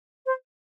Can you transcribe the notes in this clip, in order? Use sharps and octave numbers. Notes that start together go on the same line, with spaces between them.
C5